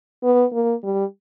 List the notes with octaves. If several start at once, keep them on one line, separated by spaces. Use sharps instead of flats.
B3
A#3
G3